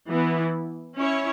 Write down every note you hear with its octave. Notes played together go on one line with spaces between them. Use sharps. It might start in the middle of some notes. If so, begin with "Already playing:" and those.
E3 B3 E4
C#4 E4 C#5